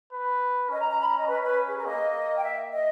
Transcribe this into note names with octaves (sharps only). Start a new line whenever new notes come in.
B4
C#4 D#5
A#5
A#5
B5
A#5
D#5
C#4 B4
B4
G#4
A#4
A#3 D#5
G5
E5
D#5